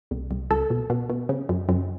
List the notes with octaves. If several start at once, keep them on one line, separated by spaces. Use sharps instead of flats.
C2
C2
C#2 A4
B2
B2
B2
C#3
F#2
F#2